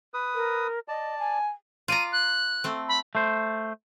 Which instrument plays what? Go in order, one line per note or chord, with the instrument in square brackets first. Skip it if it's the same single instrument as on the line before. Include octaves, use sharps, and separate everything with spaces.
[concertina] B4 D#6
[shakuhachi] A#4
[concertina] D5 A5 [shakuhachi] D#5
[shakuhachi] G#5
[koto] F4 D5 A#5 [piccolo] D#7
[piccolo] F#6
[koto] A3 C4
[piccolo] B5
[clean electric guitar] A3 C5